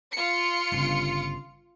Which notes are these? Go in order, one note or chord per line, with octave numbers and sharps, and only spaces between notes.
F4 C#7
G1 C#3